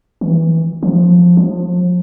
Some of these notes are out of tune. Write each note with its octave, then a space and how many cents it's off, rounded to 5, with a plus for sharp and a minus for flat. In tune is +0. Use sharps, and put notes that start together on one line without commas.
E3 -15
F3 +10
F3 +35